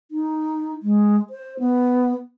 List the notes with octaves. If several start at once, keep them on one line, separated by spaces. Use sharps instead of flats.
D#4
G#3
C5
B3